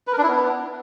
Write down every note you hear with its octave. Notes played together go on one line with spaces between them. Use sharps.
B4
A#4
D4
E4
B3